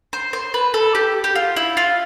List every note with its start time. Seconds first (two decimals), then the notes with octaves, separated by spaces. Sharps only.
0.13 C5
0.33 C5
0.54 B4
0.74 A4
0.95 G4
1.24 G4
1.35 F4
1.56 E4
1.77 F4